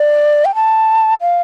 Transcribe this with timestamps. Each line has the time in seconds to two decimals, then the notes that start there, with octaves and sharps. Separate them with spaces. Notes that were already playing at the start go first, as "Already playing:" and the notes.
Already playing: D5
0.45 G5
0.55 A5
1.21 F5